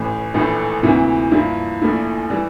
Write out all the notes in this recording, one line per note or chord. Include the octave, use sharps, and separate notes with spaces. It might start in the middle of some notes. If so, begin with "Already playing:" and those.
Already playing: A1 A2 E3
A#1 A2 E3 A3
D2 C3 E3 A#3 E4
G2 F3 A#3 E4
A#1 A#2 A3 E4
E3 G3